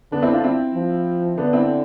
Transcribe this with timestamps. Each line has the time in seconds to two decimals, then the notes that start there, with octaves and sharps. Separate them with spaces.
0.12 D3 B3 D4
0.22 C4 E4
0.33 D4 F4
0.44 C4 E4
0.75 F3
1.37 D3 B3 D4
1.53 C4 E4